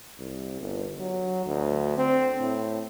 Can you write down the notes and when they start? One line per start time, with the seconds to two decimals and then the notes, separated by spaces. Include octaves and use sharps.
0.19 C2
0.60 G1
1.00 F#3
1.46 D2
1.97 C4
2.39 A2